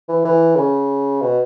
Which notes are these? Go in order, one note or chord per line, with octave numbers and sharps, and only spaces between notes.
E3
E3
C#3
B2